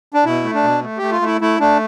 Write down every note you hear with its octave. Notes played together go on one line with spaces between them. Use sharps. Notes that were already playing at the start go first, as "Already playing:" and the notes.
D4
B2 E4
A3
D4
B2
A3
A3 G4
F4
A3 E4
A3 E4
A3 D4